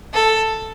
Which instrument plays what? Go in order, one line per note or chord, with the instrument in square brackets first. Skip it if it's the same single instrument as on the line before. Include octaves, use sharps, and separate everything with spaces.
[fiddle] A4